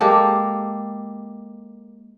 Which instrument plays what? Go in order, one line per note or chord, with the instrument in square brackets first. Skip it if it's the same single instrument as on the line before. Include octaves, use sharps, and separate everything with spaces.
[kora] G#3 A#3 G4 A4